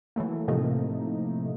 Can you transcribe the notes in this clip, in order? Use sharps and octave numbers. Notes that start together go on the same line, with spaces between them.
E3 F#3 A3 A#3
A2 C3 F3 A3 A#3 D#4